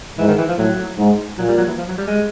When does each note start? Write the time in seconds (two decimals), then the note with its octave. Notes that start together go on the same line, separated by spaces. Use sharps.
0.18 G#2 E3
0.28 D#3
0.38 E3
0.49 F3
0.58 A2 F#3
0.97 G#2
1.38 A#2 F#3
1.48 G3
1.58 F#3
1.68 E3
1.78 F3
1.88 F#3
1.98 G3
2.07 G#3